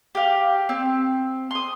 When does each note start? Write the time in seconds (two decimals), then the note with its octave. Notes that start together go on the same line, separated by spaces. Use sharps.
0.15 G4 F5
0.69 C4
1.51 C6 D#6